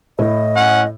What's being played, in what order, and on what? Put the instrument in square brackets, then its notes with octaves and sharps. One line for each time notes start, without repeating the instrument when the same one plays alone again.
[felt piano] A2 E4 [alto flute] D#5
[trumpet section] C#4 F#5